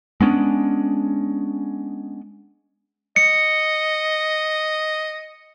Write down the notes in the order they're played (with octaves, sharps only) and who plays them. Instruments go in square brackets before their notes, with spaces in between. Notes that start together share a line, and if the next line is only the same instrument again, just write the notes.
[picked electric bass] G#3 B3 C#4 D4
[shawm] D#5 [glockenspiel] C#7